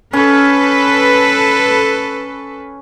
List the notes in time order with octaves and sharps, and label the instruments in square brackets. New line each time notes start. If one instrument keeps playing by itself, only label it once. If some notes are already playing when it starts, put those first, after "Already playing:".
[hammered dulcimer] C#4 [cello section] A4 B4